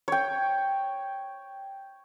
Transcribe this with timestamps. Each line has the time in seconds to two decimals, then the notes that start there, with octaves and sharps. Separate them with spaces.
0.08 C#5 G5